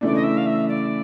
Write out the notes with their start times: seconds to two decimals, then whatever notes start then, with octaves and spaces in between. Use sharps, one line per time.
0.01 C#3 E3 A3 D4 D5
0.15 D#5
0.23 E5
0.37 F5
0.46 E5
0.68 D5